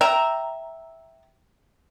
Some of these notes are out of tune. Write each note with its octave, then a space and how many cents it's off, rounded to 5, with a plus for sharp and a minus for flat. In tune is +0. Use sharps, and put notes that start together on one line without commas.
E5 -5 G5 -10 A#5 +0